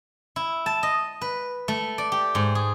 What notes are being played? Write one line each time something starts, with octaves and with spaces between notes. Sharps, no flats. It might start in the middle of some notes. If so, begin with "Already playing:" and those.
E4
A5
D#5
B4
A3
D5
G4
G#2
G#4